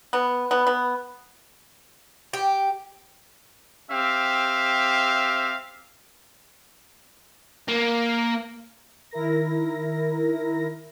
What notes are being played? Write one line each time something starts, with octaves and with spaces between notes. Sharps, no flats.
B3
B3
B3
G4
C4 G4 E5 F5
A#3
D#3 E4 A#4 A#6